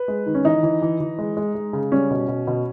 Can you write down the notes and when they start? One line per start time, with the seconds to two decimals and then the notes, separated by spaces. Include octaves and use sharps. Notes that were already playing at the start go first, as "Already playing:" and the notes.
Already playing: B4
0.08 G#3
0.26 D#3
0.35 C#4
0.45 E3 D#4
0.63 E3
0.82 E3
1.00 E3
1.18 G#3
1.37 G#3
1.55 G#3
1.73 C#3
1.92 G3 C#4
2.11 B2
2.28 B2
2.47 B2